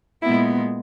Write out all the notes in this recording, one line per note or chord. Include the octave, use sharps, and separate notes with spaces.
A#2 G#3 B3 E4